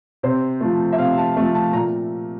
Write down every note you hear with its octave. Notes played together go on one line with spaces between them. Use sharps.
C3 C5
F3 A3
E5
C3 F5
A5
F3 A3
A5
A#2 A#5